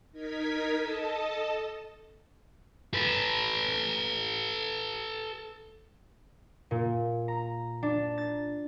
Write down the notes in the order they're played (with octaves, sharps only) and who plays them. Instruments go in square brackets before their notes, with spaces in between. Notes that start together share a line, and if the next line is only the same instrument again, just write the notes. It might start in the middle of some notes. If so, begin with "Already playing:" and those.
[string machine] D#4 A#4 G#6 B6
A4 D#5 A5
[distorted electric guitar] A4 B4
[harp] A#2
A#5
D4
A6